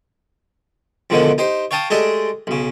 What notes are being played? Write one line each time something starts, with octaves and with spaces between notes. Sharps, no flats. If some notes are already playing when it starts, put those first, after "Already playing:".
F2 G#2 B2 D3 D#3 F3
D#4 G4 C5
C#5 F5 G5 A5 D#6
G#3 A3 G4 A4 D5 D#5
B1 C#3